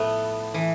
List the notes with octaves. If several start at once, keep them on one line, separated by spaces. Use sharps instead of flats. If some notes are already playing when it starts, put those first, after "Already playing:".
Already playing: A2 F3 A3 B3
E3